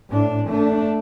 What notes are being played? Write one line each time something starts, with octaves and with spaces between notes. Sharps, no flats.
A2 D4
A3 D4